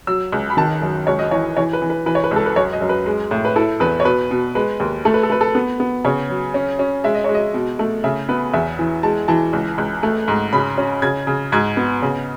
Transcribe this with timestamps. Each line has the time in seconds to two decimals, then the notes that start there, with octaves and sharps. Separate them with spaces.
0.07 F#3 E6
0.32 C#2
0.50 B5
0.57 D#3 A5
0.82 F#2
1.07 C#2 C#5
1.19 D#5
1.31 E3 C#5
1.57 E3 C#5
1.73 B4
1.82 E3
1.90 B4
2.06 E3 B4
2.15 C#5
2.24 B4
2.31 C#2 A4
2.46 B4
2.56 F#2 C#5
2.73 D#5
2.81 F#2
2.89 B4
3.06 G#3
3.31 A2
3.45 B4
3.56 E4 A4
3.80 E2 B4
4.00 C#5
4.05 B2 B4
4.31 B2
4.55 G#3 B4
4.80 D#2
5.05 A3 A4
5.14 B4
5.23 A4
5.30 A3 B4
5.41 A4
5.55 B3
5.80 B3
6.05 C#3 C#5
6.30 F#3
6.54 C#4
6.79 C#4
7.04 G#3 E5
7.15 D#5
7.24 G#3 C#5
7.35 D#5
7.54 B2
7.79 A3
8.04 C#3 E5
8.29 B3 B4
8.53 E2 E5
8.79 E3
9.03 G#3 A5
9.28 E3 A5
9.53 C#2
9.78 C#2
10.03 A3
10.28 G#2
10.53 C#3 B5
10.78 C#4
11.02 C#3 G#6
11.27 C#3
11.52 G#2 G#6
11.77 B3
12.02 C#3